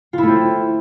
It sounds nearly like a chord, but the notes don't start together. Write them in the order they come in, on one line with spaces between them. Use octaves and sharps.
F4 E4 A3 C4